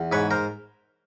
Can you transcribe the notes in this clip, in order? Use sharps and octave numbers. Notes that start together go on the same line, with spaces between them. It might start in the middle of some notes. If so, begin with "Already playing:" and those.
Already playing: E2
G#2 B4 C#5
A#4 C5